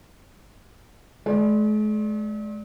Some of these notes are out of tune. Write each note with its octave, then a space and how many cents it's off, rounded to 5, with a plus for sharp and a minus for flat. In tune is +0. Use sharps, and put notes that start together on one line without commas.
G#3 +45 D5 +0